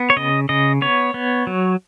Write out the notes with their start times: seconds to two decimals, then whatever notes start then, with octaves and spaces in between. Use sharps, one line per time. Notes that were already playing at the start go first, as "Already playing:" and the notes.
Already playing: B3
0.10 C#5
0.17 C#3 D#5
0.49 C#3 D#5
0.82 B3 C#5
1.14 B3
1.47 F#3